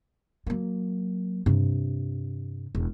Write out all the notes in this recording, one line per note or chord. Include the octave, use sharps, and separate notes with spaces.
F#3 A#3
G2 C3
E1